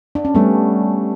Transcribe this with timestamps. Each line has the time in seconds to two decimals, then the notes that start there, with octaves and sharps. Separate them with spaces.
0.15 D4
0.25 C#4
0.35 G3 A3 B3